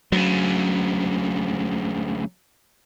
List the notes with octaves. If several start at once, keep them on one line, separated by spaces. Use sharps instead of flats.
D2 C#3 F#3